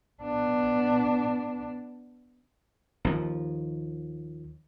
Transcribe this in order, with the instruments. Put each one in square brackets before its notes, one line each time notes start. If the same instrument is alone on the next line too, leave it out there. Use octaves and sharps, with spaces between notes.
[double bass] B3 D4
[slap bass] D#2 F3